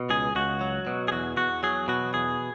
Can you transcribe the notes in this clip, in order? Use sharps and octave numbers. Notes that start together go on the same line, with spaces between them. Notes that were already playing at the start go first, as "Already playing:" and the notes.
Already playing: B2
C#2 G#4
C#2 F#4
F#3
B2
G#4
E2 F#4
E2 F#4
F#3 G#4
B2 F#4
E2 G#4